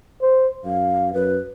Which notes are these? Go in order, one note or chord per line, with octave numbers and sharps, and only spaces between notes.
C5
F#2 F5
F#2 B4